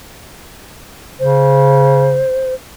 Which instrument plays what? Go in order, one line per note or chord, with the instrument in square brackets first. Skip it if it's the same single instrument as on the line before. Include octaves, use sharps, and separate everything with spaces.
[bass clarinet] C#3 [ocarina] C5